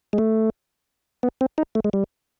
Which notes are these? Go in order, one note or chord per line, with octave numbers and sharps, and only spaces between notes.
G#3
A3
B3
C4
D#4
A3
G#3
G3